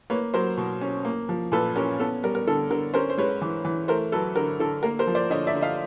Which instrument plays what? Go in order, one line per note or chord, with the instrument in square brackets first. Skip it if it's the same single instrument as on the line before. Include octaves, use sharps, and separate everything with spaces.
[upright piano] A#3 B4 C#5
F#3 A#4 C5
B2
C#4
A#3
F3
A#2 A4 B4
C#4 A#4
B3 A4
G3 A#4
A#4
D3 A4
D3 A#4
C#4 A#4 C5
C5
G#3 B4 C#5
E3
E3
A3 A#4 C5
F#3 A4 B4
D3 A#4
D3 A4
A#3 A#4
A#4 C5
F3
C5 D5
D3 C#5 D#5
D5 E5
D3
D#5 F5